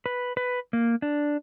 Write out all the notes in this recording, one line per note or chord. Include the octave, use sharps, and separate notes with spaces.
B4
B4
A#3
D4